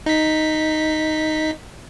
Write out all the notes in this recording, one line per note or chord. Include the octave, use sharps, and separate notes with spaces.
D#4 B6